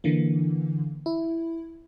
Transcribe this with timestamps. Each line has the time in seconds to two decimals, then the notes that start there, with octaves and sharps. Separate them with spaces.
0.04 D3 E3 A#3
1.06 E4